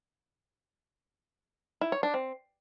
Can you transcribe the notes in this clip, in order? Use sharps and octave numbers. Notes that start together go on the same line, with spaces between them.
E4
C#5
D4
C4